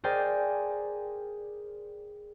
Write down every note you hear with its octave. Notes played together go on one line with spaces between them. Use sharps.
G#4 A#4 C5 D5 G5 G#5